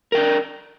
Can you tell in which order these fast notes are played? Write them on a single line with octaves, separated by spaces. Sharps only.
A#4 G5 D4